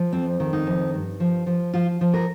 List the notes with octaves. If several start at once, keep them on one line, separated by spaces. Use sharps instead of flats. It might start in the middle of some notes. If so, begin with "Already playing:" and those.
Already playing: F3
F2 C4
D#3
D#4
F2
G2
F3
F3
F3 F4
F3
A#4